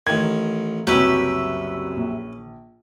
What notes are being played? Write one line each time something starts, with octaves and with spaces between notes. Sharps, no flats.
A1 D#3 G#6
F#1 C2 F#2 F#3 C#4 G4 B4 E5
A#1